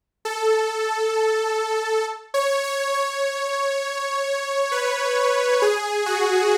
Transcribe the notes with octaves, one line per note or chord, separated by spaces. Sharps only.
A4
C#5
C#5
C#5
B4
G#4
F#4